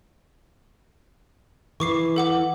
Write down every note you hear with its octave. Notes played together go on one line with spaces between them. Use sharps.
E3 C#6 D6 C7
A4 F#5 D6